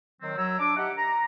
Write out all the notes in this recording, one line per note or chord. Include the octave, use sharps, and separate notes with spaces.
D#3 F#3 C4
F#2 F#3 C#5 A#5 E6
D4 D6
D#4 G4 E5 F#5
A#5